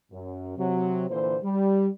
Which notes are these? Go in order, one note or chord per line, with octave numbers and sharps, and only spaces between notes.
F#2
C3 F#3
A#2 D3 E3 C5
G3